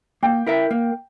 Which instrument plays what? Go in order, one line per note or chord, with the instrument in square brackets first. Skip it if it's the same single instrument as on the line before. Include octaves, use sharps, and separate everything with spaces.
[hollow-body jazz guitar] A#3 [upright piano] G5
[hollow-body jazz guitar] E4 A#4 E5
A#3